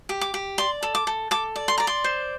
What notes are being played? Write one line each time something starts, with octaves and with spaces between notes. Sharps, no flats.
G4
D6
G4
D5 C6
A4
D6
A4
A4 D6
D5
C6
D5 A#5
C6
C5